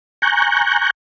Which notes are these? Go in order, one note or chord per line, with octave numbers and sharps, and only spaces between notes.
G#5 A#5 C#6 F#6 G6